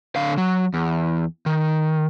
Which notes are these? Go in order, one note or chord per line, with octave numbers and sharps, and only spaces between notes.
D3 F5
F#3
E2
D#3